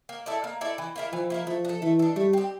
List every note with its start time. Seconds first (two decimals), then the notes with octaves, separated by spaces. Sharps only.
0.09 A#3
0.26 E4 A4 D5
0.44 A#3
0.61 E4 A4 D5
0.78 E3
0.96 A#3 E4 A#4
1.12 E3 F3
1.30 A#3 E4 A#4
1.47 F3 A3
1.65 D4
1.69 A4
1.82 E3 A3
1.99 D4 A4
2.16 G3 A3
2.33 C4 G4